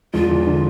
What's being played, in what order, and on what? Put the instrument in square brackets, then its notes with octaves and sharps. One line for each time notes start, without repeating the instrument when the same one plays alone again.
[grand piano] E1 [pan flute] F4
[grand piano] E2
D3